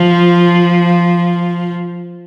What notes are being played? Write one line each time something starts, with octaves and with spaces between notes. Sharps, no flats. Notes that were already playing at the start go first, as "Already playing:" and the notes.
Already playing: F3